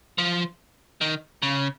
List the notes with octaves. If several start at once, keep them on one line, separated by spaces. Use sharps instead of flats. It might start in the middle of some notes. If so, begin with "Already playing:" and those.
F3
D#3
C#3